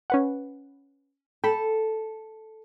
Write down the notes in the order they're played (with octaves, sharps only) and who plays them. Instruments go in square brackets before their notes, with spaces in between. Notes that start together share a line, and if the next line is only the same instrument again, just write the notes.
[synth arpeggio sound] C#4 B4 F#5
[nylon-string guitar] A4 [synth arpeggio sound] G5 B5